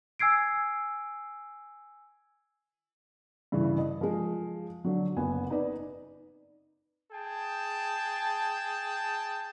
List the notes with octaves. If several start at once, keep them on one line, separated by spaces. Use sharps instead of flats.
G#5 E6 G#6 C7 D7
G2 C#3 E3
D#5
F3 G#3
D3 F#3
F#1 B3 G#5
D#4 B4 D5
G#4 G5 A5